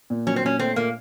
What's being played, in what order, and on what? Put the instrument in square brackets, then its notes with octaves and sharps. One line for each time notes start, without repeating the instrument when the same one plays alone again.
[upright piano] A#2
[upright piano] F#3 [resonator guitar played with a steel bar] C#4
[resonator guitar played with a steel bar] C4
[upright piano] A#2 [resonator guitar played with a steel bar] C#4
[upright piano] A3 [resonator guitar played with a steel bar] C4
[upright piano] A#2 [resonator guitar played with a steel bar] A#3